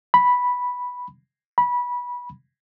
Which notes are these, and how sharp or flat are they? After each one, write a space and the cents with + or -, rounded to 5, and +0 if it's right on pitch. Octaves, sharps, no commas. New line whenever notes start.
B5 -5
B5 -20